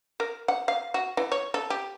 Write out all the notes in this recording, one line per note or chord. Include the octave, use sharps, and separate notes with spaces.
A#4
F#5
F5
F#4
E3
C#5
A4
G4